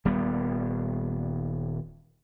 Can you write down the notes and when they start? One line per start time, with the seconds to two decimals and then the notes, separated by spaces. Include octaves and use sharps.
0.05 D#1 G3 B3